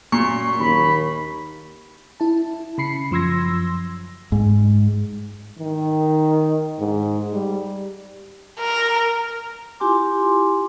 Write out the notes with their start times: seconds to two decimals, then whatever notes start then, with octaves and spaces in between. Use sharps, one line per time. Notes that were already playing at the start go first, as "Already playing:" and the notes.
0.12 F#2 A#2 C#6
0.60 D#2 B5
2.20 E4 A5
2.78 C#3 B5 C7 C#7
3.11 F#2 F3 C6 E6 G#6 A#6
4.32 G#2
5.59 D#3
6.80 G#2
7.33 G3
8.60 A#4
9.80 E4 F4 G4 G#5 C6 D6